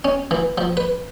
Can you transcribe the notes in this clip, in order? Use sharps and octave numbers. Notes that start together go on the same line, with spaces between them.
C#4
E3
F3
B4